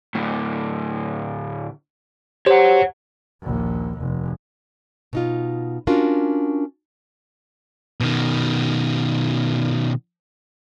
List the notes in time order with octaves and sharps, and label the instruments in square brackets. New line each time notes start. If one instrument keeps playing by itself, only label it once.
[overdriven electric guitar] D2 A2
[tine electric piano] G4 C5 [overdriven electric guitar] C#5 F#5
[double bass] A#1 D#2
F1
[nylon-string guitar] B2 D#4 F4
C#4 D4 F4 F#4 A#4
[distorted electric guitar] B2 D#3